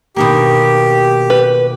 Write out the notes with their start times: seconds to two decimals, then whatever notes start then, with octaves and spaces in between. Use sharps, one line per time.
0.16 B2 D#3 A#3 G4
1.30 B4